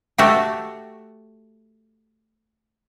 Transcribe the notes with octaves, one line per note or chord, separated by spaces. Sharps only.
A3 F#4 G4